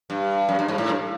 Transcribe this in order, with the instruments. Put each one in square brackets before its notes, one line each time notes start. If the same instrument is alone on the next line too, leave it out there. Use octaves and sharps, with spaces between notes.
[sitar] G2
F#2
G2
G#2
A2
G2